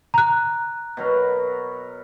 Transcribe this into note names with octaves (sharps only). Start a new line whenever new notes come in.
A#5 F#6
B2 F#3 A#4